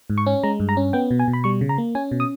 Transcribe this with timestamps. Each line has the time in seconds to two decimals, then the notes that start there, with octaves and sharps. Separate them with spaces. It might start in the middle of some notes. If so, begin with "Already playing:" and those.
0.10 G#2
0.18 C#6
0.26 C#4
0.43 G#3 A#5
0.60 G2
0.69 A#5
0.77 C#4
0.93 B3 G5
1.11 B2
1.19 G#5
1.28 B2
1.33 B5
1.44 G3 C#6
1.61 C#3
1.69 A#5
1.78 A#3
1.95 C#4 G#5
2.11 B2
2.20 D#6